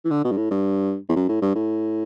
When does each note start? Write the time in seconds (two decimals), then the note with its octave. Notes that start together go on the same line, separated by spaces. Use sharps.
0.05 E3
0.11 D3
0.25 B2
0.31 G2
0.37 A2
0.51 G2
1.09 E2
1.16 F#2
1.29 A2
1.42 G2
1.55 A2